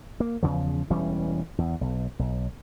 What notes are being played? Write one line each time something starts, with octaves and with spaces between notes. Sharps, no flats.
A#3
E2 C#3 F3
E1 E3 G3 C#4
E2
B1
B1